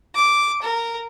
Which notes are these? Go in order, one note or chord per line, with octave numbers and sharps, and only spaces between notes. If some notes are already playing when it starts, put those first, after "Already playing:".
D6
A#4